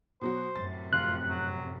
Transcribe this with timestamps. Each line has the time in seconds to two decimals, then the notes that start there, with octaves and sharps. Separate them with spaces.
0.21 B2 F#3 F#4 C5
0.56 F#2 A2 C3 A6
0.93 F1 F4 F#6
1.29 F#3